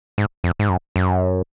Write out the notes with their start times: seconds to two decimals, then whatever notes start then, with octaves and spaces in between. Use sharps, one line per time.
0.18 G#2
0.44 F2
0.59 G#2
0.69 F#2
0.96 F#2